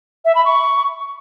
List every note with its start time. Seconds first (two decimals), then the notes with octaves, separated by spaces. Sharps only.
0.25 E5
0.35 B5
0.45 C#6